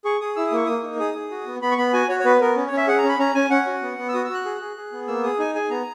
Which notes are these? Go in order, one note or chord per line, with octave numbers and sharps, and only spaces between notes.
G#4 C#6
G#4 D#6
E4 E6
D#6
A#3 C#6
A#3 D#6
D#4
G#4 D#6
G#4
F#4
B3
B3 B5
C#6
B3 B5
F#4 G#5
F#4 C#5
C#5
B3 B4
B3 A#4
C#4
C#5
C#4
E5
G#4 F#5
A#5
C#4
B5
C#4 A#5
C#4 G#5
C#4 F#5
F#4
B3
B3
E6
F#4 D#6
E6
F#4 F#6
G#4
G#4
G#4
B3
A#3 E6
G#4 D#6
D#4 G#5
G#4 G#5
B3 A#5